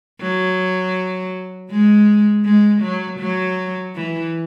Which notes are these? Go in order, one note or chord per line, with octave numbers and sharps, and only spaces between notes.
F#3
G#3
G#3
F#3
F#3
E3